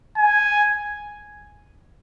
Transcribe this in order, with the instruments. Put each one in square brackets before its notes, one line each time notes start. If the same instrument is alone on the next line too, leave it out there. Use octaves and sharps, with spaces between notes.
[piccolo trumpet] G#5